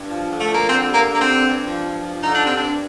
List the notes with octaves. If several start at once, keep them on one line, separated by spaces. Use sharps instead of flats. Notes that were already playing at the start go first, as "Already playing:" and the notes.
Already playing: G2
F3
D3
A3
F3 A#3
D3 C4
G2
A#3
D3
A#3
C4
G2
G2
F3
G2
F3
D3 D#4
D4
G2 C4
G2 D4